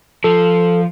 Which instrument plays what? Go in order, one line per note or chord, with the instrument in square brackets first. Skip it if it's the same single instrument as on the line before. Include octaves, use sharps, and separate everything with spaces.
[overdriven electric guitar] F3 [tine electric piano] A4